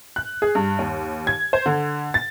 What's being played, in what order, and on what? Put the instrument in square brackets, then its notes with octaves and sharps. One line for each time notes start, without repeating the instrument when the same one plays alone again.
[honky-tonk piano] F#6
G#4
G2
D#2
G#6
C5
D3
A6